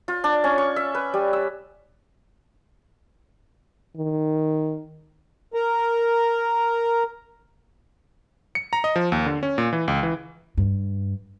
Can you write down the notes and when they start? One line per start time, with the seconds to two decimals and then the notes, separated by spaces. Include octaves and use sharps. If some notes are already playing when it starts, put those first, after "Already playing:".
0.08 F4
0.24 D4
0.44 C#4
0.58 C#6
0.76 E5
0.95 B4
1.14 G3
1.33 E6
3.97 D#3
5.54 A#4 A#5
8.55 C#7
8.73 A#5
8.84 D#5
8.96 F3
9.12 D#2
9.26 D3
9.43 C#4
9.58 A#2
9.73 E3
9.88 C#2
10.03 E3
10.57 G2